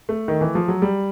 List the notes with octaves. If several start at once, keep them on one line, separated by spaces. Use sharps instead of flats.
A3
D#3
E3
F3
F#3
G3